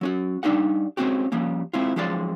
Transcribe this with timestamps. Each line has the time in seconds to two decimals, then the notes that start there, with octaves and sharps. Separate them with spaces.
0.01 F#3 C#4 F#4
0.43 G3 D4 D#4 G4 F#5
0.97 G#3 A#3 C4 C#4 F#4 G4
1.32 F3 G3 A#3 C#4
1.73 G#3 C4 E4 F4
1.96 F3 F#3 G#3 C#4 F4 D5